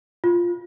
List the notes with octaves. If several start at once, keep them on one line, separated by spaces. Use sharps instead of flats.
F4